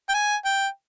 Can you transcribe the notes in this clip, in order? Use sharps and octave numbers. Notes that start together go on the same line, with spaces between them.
G5
G#5
G5